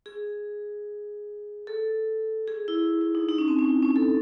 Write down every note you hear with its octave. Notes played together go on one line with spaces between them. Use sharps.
G#4
A4
G#4
E4
E4
D#4
D#4
C#4
C4
C#4
E4
C#4
A4